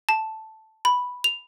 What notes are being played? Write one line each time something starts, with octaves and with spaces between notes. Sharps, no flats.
A5
B5
F7